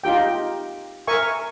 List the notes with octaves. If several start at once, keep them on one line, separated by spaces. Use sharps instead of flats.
D#4 F4 G4 G5
A#4 E5 G#5 C#6